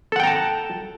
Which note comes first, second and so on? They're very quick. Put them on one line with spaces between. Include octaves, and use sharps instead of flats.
A4 F#5 G5 A#5 A5